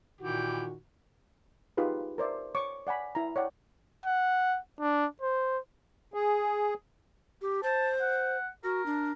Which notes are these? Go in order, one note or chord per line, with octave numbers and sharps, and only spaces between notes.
A#2 D#3 E3 F#4 G4
D#4 F4 G4 G#4 B4
A#4 C5 D5 E5
C#5 C#6 D6
D5 F#5 G#5 B5
E4 A#5
C#5 D5 F#5 G5
F#5
D4
C5
G#4
G4
C5 A5
F#5
F#4 A#4
D4